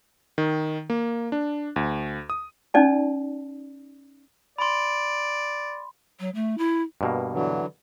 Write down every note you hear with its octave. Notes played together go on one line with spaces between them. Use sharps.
D#3
A#3
D4
D2
D#6
C#4 D#4 D5 A5
D5 B5 C6
F#3
A3
E4
G2 B2 A#3
D3 E3 F#3